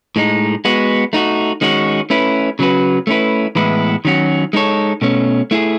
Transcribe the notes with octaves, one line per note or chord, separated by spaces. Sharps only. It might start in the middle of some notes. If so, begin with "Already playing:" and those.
A2 G#3 D#4
G#3 B3 F#4
A3 D#4 F#4
D#3 G#3 C#4 F#4
A3 C#4 E4 B4
C#3 F#3 C#4 F#4 B4
A3 C#4 E4 B4
A2 E3 G#3 B3 E4
D#3 F#3 C#4 F#4
G#3 D#4 A4 C#5
B2 A3 C#4
A3 E4 G#4